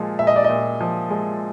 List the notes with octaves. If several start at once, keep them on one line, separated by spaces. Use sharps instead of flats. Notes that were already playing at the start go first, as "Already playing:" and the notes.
Already playing: A#2 F3 G#3
A#2 E5
D#5
D5
A#2 D#5
F3
G#3